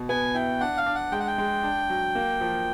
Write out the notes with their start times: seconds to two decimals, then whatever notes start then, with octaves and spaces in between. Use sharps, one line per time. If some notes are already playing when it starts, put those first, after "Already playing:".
Already playing: B2
0.09 B3 G#5
0.34 E4 G5
0.61 D4 F#5
0.77 F5
0.86 D4
0.95 F#5
1.12 G#3 G5
1.20 F#5
1.27 G5
1.38 G#3
1.63 D4
1.90 F#3
2.15 A#3
2.41 F3